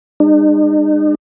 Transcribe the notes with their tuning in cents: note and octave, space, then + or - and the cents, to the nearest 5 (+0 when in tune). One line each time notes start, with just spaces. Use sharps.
G#3 -40 D#4 -45